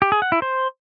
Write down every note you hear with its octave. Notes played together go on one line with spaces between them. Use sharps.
G4
G#4
F#5
E4
C5